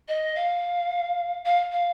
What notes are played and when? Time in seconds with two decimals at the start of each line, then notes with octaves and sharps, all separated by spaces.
0.08 D#5
0.36 F5
1.45 F5
1.72 F5